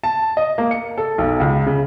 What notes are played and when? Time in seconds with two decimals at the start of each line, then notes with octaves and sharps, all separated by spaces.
0.04 A5
0.37 D#5
0.58 A#3
0.71 C#7
0.98 A4
1.18 B1
1.40 C#2
1.66 C#3